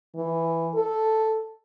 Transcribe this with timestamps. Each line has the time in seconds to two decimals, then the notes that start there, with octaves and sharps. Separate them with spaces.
0.15 E3
0.74 A4